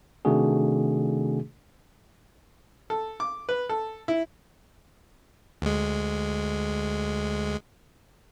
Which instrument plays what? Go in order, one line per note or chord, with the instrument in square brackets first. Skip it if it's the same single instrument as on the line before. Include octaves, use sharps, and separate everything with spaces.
[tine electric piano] C3 D#3 A3 D4 F#4 G#4
[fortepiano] A4
D6
B4
A4
E4
[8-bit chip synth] D2 G#3